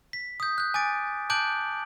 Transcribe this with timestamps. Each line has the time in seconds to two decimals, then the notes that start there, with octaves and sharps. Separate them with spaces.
0.13 B6
0.40 D#6 G6
0.58 F#6 G6
0.74 G#5 D6 A6 D7
1.30 A5 D6 F#6 G6 D7 F#7